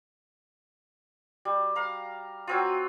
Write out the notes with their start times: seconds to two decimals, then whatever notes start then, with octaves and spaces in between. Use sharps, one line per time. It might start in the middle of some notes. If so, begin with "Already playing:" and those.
1.45 G3
1.75 F5 A#5
2.47 F#3 C4 F4